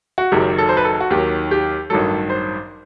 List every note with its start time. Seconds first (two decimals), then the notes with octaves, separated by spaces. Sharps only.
0.18 F#4
0.32 F#1 F#2 D#3 F#3 G4
0.58 A4
0.69 C5
0.77 B4
0.85 A4
1.01 F#4
1.10 D#2 D#3 F#3 G4
1.51 G4
1.90 A1 G2 D#3 F#3 A4
2.30 C5